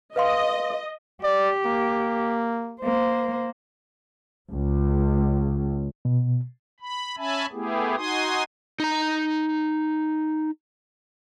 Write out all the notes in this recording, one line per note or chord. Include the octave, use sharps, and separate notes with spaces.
B4 D#5 F5 C6
G4 D5
A#3
A#3 C5
C#2
B2
B5
C#4 E5 G#5 A5 B5
A3 B3 E4 G4 G#4
D#4 F#4 G#5 C6 D#6
D#4 A#5